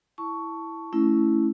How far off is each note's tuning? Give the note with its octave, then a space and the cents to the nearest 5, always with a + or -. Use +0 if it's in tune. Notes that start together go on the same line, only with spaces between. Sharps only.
E4 +0 A5 +0 C#6 +10
A3 -10 C#4 +0 E4 +0